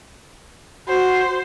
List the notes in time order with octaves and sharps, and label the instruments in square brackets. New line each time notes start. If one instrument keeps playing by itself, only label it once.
[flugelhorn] F#4 [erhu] C5